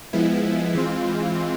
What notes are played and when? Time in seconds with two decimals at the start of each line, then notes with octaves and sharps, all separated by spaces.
0.13 F3 G#3 B3 E4
0.75 E3 G#3 C4 F4